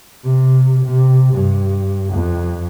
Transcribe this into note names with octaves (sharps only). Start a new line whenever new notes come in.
C3
C3
G2
F2